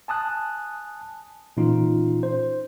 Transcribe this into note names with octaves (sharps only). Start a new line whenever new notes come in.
G#5 A5 D#6 F#6
A#2 E3 C#4 D#4 F4
C5